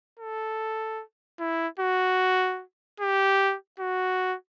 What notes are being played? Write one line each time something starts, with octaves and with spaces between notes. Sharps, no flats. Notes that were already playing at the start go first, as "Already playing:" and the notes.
A4
E4
F#4
G4
F#4